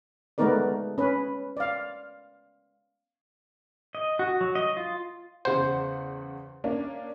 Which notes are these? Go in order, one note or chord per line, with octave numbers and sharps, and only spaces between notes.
G#3 A3 B3 D#4 A#4 D5
C#4 B4
D5 F5
D#5
F#4
F#3
D#5
F4
E2 C#3 C5 F#5
A#3 C#4 D4